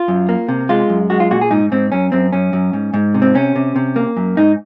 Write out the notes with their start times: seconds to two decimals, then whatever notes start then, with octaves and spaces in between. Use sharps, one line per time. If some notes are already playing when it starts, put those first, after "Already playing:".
Already playing: F4
0.08 F#2
0.29 A#3
0.48 C3
0.69 G#3 F4
0.89 F#2
1.10 G#3 F#4
1.20 F4
1.31 A#2 F#4
1.41 G#4
1.51 G#2 D#4
1.72 G#2 C4
1.92 F#2 C#4
2.12 F#2 C4
2.33 F#2 C#4
2.53 F#2
2.73 G#2
2.94 G#2
3.14 C3
3.22 C4
3.35 C3 C#4
3.56 C3
3.76 C3
3.96 A#3
4.17 F#2
4.37 G#2 D#4